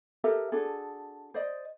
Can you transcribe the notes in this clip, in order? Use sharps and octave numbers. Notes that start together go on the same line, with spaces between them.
G4 A4 A#4 E5
D4 F#4 G#4 A4
C5 D5 D#5